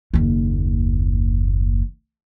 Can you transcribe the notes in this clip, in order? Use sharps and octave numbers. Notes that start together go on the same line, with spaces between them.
F#1 D#2